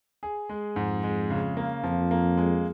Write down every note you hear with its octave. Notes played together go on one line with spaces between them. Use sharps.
G#4
G#3
F2 G#2
G#3
C#3
A#3
F2 F3
A#3
G#3